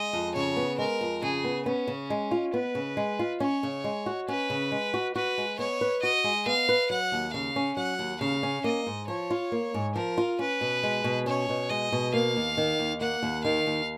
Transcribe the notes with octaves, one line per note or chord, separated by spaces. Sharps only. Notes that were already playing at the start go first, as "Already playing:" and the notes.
Already playing: G#3 D#5
F2
C#3 C#5
B3
G#3 A#4
F2
C#3 G#4
B3
B3 C#4
C#3
G#3
F4
B3 B4
C#3
G#3
F4
C#4 C#5
C#3
G#3
F#4
C#4 B4
C#3
G#3
F#4
F#4 B4
G#3
B3 C#5
B4
F#4 D#5
G#3
B3 F5
B4
F#3 F#5
D#2
C#3 F5
C#4
F#3 F#5
D#2
C#3 F5
C#4
A#3 D#5
G#2
F3 C#5
F4
A#3
G#2
F3 A#4
F4
C#4 B4
B2
G#3
B2
C#4 C#5
B2
G#3 D#5
B2
A#3 F5
D#2
D#3
D#2
A#3 F#5
D#2
D#3 F5
D#2